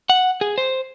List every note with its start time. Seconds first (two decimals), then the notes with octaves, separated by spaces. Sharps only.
0.10 F#5
0.41 G#4
0.58 C5